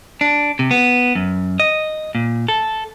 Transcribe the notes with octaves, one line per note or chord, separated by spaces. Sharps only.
D4
C3
B3
F#2
D#5
A#2
A4